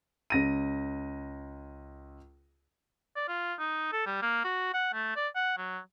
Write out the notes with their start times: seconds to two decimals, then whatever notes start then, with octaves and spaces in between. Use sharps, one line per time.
0.30 C#2 A#6 D#7
3.16 D5
3.28 F4
3.59 D#4
3.93 A4
4.06 G3
4.22 A#3
4.44 F#4
4.74 F#5
4.93 A3
5.16 D5
5.36 F#5
5.57 F#3